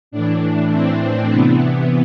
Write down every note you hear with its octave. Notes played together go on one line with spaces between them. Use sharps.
A2 E3 D4
C4
C4
C3 E3 B3